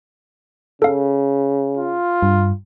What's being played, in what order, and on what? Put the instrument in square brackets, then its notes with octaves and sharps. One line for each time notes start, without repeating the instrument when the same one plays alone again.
[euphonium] C#3 [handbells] A4 F5
[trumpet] F4
[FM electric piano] G2